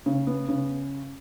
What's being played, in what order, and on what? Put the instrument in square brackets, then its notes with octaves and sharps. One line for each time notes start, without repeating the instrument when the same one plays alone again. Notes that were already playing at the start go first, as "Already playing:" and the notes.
[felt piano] C#3
B3
C#3